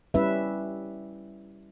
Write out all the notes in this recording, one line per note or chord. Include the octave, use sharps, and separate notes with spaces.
G3 C#4 E4 B4 E5